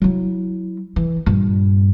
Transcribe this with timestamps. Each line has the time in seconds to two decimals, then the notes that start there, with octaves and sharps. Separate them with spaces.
0.02 F#3 E4
0.96 E3
1.26 G2 A#2